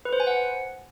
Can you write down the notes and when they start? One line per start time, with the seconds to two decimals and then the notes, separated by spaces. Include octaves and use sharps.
0.05 B4
0.13 C5
0.20 G#5
0.27 F#5